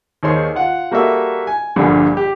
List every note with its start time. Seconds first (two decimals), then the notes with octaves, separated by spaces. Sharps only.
0.23 D#2 D#3 G#4 C5 C#5 C6
0.56 F4 F#5
0.91 G3 A#3 F#4 A4 E5
1.47 G#5
1.76 A#1 G2 A#2 D3
2.17 G4